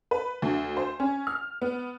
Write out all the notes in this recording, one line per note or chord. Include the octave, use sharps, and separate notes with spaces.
B4
D2
C5
C#4
F6
B3